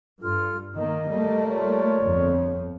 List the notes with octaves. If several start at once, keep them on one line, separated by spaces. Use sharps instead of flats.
G2 F4 A4 F6
D#3 A#3 D#5
G3 A3 A#3
F4 A#4 C#5 D5
G1 F2